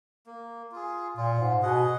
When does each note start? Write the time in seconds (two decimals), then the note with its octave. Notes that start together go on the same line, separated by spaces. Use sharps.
0.26 A#3
0.72 F4 G#4
1.17 A#2 F4
1.40 G#2
1.62 B2 G#4 D#5 F#5